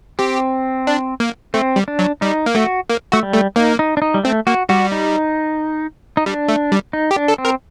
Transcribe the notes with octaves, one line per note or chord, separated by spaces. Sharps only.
C4 G4
D4
A#3
A3 C4
G3
D4
F#3
G3 D#4
A#3
A3 F#4
A#3
A3 F#4
G3
A3
A#3 D#4
D#4
D4
D#4
G3
A3 C4
A#3 F#4
G3 F#4
D#4
D#4
G3 D4
A3
G3
D#4
G4
D4
A4
C4
A#4